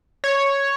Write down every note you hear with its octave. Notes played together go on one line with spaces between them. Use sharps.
C#5